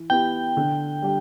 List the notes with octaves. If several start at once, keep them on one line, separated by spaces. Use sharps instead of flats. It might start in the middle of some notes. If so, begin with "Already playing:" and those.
Already playing: E3
B3 E4 G4 G5
D3
G3 D4 G4